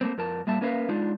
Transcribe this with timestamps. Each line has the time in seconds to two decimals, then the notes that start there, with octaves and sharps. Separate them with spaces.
0.01 A3 A#3 C4
0.18 F2 A#4 A5
0.47 A2 G3 A#3 E5 A5
0.61 A#3 C#4 A#4 B4 E5 F5
0.89 G#3 D4 D#4 F4